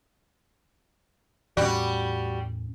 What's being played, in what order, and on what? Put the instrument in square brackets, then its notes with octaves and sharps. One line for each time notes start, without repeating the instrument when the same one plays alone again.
[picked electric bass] E2 A2 C#4 [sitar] G3 F#4